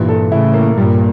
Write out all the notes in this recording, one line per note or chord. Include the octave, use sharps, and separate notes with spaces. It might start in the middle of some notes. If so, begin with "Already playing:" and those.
Already playing: G2 A#2 E3
A4
A2 C#3 E4
A#3
G2 A#2 G3